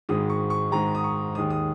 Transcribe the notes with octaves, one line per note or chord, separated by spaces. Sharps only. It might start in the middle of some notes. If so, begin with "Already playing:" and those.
G#1 G#2 D#3 G#3 D#6
C#6
C#6
G#1 G#2 D#3 G#3 A#5
D#6
C#6
D#2 D#3 G#3 D#6
D#6